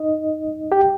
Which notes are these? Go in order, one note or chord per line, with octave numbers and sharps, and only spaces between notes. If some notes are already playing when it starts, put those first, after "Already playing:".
Already playing: D#4 D#5
G4 G5